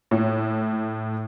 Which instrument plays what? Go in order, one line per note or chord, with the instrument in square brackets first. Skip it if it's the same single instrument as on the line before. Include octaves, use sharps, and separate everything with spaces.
[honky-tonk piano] A2